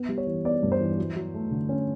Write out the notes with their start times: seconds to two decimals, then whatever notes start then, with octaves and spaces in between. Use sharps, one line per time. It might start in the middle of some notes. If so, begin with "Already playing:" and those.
Already playing: B3
0.09 G3
0.18 C#5
0.27 E3
0.45 B3 D5
0.63 G2
0.72 C5
0.81 E3
0.98 F#3
1.16 F#3
1.34 A3
1.51 D3
1.69 C#4